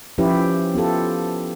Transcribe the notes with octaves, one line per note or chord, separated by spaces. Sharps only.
F3 C#4 E4 G4 B4
B3 F4 G4 A4